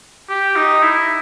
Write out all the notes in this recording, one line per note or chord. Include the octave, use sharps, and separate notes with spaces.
G4
D#4
E4